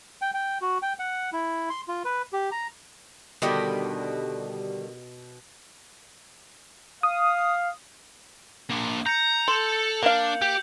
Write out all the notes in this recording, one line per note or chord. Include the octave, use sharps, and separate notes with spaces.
G5
G5
F#4
G5
F#5
E4
C6
F4
B4
G4
A#5
B2 D3 D#3 G3 G4 D#5
F5 D#6
A#3 D4
A#5 G6 C#7
A4 C6 G6 F7 F#7
A#3 D4 F5
G4 G6